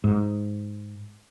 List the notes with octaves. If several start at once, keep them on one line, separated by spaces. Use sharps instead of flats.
G#2